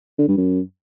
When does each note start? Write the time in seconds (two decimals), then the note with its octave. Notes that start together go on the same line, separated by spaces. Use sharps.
0.19 D3
0.28 G2
0.37 F#2